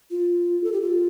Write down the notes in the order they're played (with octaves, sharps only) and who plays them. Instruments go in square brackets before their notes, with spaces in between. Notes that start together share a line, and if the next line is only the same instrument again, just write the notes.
[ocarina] F4
A4
G4
F4